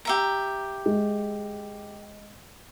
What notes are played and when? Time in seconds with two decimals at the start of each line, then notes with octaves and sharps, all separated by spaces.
0.05 G4 E5 A#5
0.86 G#3